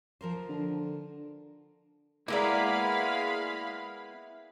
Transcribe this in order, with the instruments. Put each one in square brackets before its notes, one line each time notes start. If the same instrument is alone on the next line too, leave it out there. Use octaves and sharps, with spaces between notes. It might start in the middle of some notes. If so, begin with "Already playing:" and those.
[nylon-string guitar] F3 A#4 C5
[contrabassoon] D3
[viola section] G#3 F5 B5 [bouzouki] A#3 B3 D5 [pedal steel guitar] E4